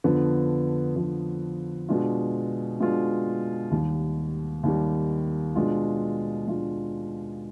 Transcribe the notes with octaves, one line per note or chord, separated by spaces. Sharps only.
F2 D3 F3 B3
F2 D3 F3 B3
B2 G#3 D4 F4
B2 G#3 D4 F4
D#2 D#3 G3
D#2 D#3 G3
B2 G#3 D4 F4
B2 G#3 D4 F4